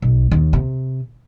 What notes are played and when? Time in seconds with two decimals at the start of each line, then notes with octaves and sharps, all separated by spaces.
0.02 B1
0.31 D#2
0.53 C3